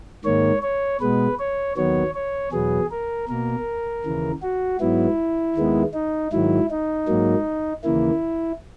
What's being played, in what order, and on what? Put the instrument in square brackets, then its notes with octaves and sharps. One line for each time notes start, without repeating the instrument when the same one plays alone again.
[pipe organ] G#2 D#3 A#3 C#5
C#5
B2 G#3 B3 B4
C#5
D#2 D#3 F#3 B3 C#5
C#5
E2 B2 F#3 B3 G#4
A#4
B2 A#3 A#4
D#2 C#3 E3
F#4
G#2 F#3 B3 E4
D#2 D#3 G#3 B3
D#4
G#2 D#3 F#3 E4
D#4
G#2 F#3 A#3
D#2 C#3 E3 A#3 E4